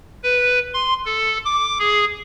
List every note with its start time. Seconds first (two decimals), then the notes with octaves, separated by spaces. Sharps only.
0.23 B4
0.73 C6
1.05 A4
1.45 D6
1.79 G#4